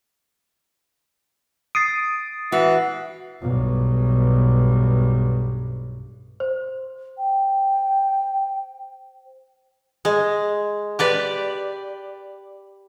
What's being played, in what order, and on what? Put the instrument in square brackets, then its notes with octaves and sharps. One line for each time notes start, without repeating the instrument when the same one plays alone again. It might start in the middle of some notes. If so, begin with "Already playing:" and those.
[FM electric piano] D#6 [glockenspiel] A6 C7 D7
[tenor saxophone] E3 [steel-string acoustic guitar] F#4
[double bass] B1 G2
[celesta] C5
[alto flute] G5
[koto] G#3
G4 B4 D5